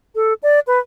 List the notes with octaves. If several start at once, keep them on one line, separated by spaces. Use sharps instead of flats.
A4
D5
B4